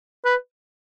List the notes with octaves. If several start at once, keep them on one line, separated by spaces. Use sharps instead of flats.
B4